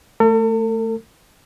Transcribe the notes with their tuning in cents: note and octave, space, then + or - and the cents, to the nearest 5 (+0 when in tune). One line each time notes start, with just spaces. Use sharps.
A3 +0 A4 +45